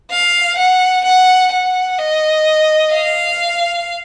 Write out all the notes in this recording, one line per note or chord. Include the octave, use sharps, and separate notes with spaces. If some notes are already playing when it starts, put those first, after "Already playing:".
F5
F#5
F#5
F#5
D#5
F5